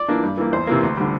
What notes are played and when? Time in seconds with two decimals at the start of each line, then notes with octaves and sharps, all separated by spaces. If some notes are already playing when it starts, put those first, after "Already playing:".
Already playing: D5
0.08 E3 A#3 D4
0.23 G2
0.37 E3 A#3
0.52 E2 C5
0.67 C3 E3 A#3
0.83 D2
0.97 D3 G3